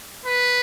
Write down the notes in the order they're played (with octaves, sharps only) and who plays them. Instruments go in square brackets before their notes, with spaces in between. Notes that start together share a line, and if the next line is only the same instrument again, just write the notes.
[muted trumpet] B4